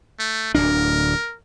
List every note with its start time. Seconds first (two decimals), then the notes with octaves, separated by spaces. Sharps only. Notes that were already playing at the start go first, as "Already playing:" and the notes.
0.19 A3
0.55 D1 D2 D4 A#4